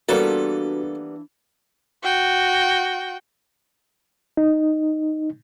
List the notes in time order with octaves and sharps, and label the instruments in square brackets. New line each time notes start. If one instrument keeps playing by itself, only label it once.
[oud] E3 D4 F4 [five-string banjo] G3 A#3 B3 [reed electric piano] F#4 [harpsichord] A4
[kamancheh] F#4 G5
[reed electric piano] D#4